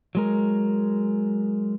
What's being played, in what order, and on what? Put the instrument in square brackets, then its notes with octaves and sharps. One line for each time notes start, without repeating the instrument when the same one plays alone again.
[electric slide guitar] F#3 G#3 A#4